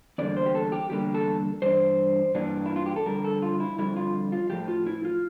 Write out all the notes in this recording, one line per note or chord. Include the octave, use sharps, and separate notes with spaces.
E2 D3 G3 A#3 D5
C5
G4
A4
G4
E2 D3 G3 A#3 G4
A4
G2 E3 D4 C5
G2 E3 G3 A#3 D4
E4
F4
G4
A4
F2 D3 G3 A#4
A4
F4
E4
F2 D3 G3 E4
F4
F4
A2 F3 A3 G4
F4
E4
F4